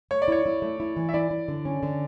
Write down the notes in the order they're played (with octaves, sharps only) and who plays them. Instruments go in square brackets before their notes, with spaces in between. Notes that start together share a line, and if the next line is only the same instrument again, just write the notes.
[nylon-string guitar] A3 [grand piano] C#5
[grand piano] D5
[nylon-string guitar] E4 [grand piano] C#5
[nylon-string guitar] E4
A3
E4
E3
[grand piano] E5
[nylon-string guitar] E4 [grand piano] D5
[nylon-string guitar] E4
D3
C#4
D3